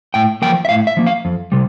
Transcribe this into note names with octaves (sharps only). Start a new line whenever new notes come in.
A2 G5
F3 A#3 G5
E5
A2 F5
E5
F3 A#3
F5
F2
C3 G3